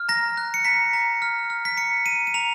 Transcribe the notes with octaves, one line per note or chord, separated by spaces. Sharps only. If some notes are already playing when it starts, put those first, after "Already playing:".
Already playing: F6
A#5 A#6
F#6
C#7
A#5 B6
A#5
F6
F6
B6
A#5 C#7
A#5 D#7
D#7
A#5 F7